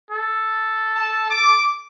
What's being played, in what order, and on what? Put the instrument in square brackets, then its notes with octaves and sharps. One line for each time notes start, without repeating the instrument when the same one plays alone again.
[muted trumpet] A4
[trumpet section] A5
D6